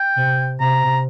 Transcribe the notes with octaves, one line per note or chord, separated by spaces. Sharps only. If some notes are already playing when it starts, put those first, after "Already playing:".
Already playing: G5
C3
C3 A#5